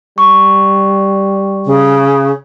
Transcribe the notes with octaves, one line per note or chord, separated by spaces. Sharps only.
G3 C#6
C#3